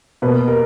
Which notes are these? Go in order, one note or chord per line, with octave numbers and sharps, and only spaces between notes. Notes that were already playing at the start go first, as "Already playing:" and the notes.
B2 A#3 B4
A#4